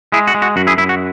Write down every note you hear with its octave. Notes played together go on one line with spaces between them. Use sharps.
G#3 E4 G#4
F#4
G#3
F#4
F#2 F#4
E4 G#4
F#2 E4
F#4